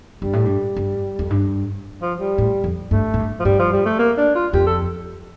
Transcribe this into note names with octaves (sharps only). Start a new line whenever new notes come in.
G2 G3
A2
G2
G2
F2
G2
F3
G3
A2
F2
G2 A3
A2
G2
F3
G2 G3
F3
G3
A3
A#3
D4
F4
F2 G4
A4